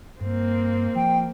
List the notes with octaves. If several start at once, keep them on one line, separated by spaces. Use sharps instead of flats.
G2 A#3 C4
F3 G5